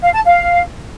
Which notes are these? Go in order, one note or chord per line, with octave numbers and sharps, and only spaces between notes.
F5
A5
F5